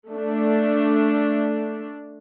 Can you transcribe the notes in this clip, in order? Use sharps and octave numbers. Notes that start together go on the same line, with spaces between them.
A3 D4